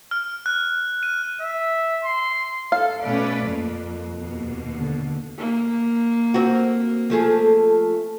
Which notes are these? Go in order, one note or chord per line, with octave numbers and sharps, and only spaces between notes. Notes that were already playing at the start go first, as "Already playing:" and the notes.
F6
F#6
D#7
E5
C6
A4 F5
B2 A3 C#4 B4 D5
F2 F3 A#3
D#2 B2 A#3
D3
A#3
C4 F#4
F3 A3 G#4